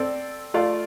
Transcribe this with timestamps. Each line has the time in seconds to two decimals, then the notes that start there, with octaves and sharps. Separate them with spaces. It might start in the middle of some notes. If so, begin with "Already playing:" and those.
Already playing: C4 A4 D5
0.54 A3 F4 D5 F5